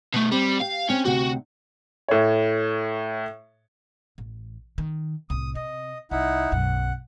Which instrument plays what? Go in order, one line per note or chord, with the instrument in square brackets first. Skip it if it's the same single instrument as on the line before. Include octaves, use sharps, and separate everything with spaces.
[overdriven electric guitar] B2 A3
[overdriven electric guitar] G3 [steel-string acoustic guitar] C4
[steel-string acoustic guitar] G4 [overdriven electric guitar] F5
[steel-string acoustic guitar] C4 [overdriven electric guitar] C#4
[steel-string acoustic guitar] D2 C3 F#5 [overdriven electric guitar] F#4
[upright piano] A2 C#5
[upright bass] A1
D#3
[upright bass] C2 A2 [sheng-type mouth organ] D#6
[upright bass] C3 [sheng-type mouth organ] D#5
[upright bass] C2 [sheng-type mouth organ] D#4 E4 F#5
[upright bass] B1 F#2 [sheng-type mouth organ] F#5